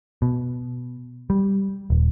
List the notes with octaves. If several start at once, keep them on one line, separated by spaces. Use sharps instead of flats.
B2
G3
D#1